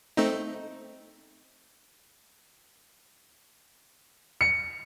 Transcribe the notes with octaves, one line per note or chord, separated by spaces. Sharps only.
A3 C4 D#4
C#7